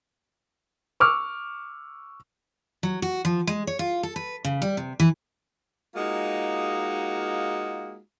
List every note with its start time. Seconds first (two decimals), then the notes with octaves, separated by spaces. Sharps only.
1.00 C#6 D6 E6 F6
2.83 F#3
3.02 F#4
3.25 F3
3.47 G#3
3.67 C#5
3.79 F4
4.03 A4
4.16 B4
4.45 C#3
4.62 G3
4.77 C3
5.00 E3
5.95 G#3 A#3 D#4 F4 F#4